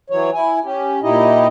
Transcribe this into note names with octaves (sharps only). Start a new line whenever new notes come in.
E3 F#3 C#5
E4 G#5
C#4 G4
A#2 D#4 E4 G4 D#5